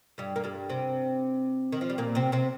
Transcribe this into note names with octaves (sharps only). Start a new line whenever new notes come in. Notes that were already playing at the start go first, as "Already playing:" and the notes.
G2 G3
A#3
G2 G3
C3 C4
D#3
F3
G3
A#2 A#3
C3 C4
C3 C4